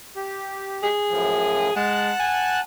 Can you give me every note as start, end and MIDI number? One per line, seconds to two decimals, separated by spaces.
0.16 0.89 67
0.83 1.74 68
1.10 1.70 42
1.10 1.70 45
1.10 1.70 53
1.76 2.11 56
1.76 2.60 78
1.76 2.60 81
1.76 2.60 90
2.19 2.59 80